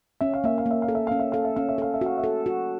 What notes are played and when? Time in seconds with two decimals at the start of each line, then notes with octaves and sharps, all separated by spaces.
0.21 C#4 E5
0.34 F5
0.44 A#3 E5
0.58 F5
0.66 A#3
0.71 E5
0.82 F5
0.89 A4
0.95 E5
1.07 C#4 F5
1.20 E5
1.32 A4 F5
1.45 E5
1.56 C#4 F5
1.69 E5
1.78 A4 F5
1.94 E5
2.01 F#4 F5
2.18 E5
2.24 A4
2.46 F#4